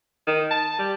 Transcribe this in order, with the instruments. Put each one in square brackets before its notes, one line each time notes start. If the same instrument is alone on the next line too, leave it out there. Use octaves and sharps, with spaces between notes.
[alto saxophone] D#3
A5
G3